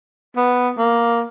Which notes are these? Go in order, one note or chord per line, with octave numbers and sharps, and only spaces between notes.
B3
A#3